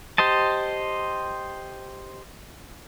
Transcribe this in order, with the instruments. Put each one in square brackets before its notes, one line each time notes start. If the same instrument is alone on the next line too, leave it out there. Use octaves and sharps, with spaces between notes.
[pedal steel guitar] G4 C5 D#5 A5